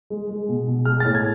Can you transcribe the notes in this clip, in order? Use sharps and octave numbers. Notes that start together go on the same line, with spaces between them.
G#3
G#3
B2
B2
G#3 F6
A2 A6
G#6